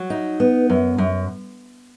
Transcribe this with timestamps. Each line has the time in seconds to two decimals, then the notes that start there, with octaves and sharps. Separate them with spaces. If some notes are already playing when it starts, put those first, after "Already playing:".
Already playing: F#3
0.10 D#4
0.40 B3
0.70 F#2
0.98 F#2